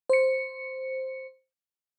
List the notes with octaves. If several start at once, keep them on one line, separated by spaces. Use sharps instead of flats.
C5 C#7